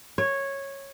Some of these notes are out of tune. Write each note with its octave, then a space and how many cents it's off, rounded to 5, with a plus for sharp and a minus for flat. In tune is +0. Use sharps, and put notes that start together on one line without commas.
C#5 -10